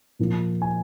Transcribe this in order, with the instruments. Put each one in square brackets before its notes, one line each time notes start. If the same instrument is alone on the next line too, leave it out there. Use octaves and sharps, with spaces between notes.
[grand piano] A#2 F3 A#3
G#5